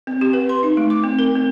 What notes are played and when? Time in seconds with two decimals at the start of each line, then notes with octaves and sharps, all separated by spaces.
0.07 C4
0.21 G4
0.33 B4
0.49 C6
0.63 D#4
0.77 A3
0.90 D6
1.04 C4
1.19 A#4
1.36 C4